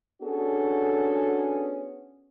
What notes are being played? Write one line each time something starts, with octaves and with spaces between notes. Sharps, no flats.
B3 C#4 D4 F#4 G#4 A4